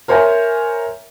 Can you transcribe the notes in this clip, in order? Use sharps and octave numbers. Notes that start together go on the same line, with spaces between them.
A#4 C5 C#5 E5 G#5 A#5